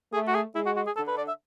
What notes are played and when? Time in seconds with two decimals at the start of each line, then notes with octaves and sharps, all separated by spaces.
0.13 A3 G#4
0.28 F#4
0.35 G#4
0.55 G#3 E4
0.66 F#4
0.76 F#4
0.86 G#4
0.97 D3 A4
1.07 B4
1.17 D5
1.28 E5